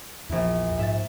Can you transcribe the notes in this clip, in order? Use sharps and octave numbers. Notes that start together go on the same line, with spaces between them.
A#1 E2 E4
G#2 E5 A6